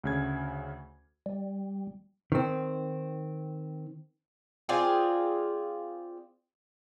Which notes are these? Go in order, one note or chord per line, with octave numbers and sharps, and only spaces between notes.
D2 C#3 G#6
G3
D#3 C4
C4 F4 G#4 D5